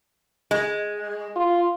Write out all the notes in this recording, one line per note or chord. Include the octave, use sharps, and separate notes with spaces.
G#3
F4